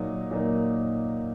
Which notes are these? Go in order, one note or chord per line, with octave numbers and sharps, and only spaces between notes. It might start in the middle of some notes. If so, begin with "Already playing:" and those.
Already playing: A#2 F#3 A#3 D#4 D#5
A#2 F#3 A#3 D#4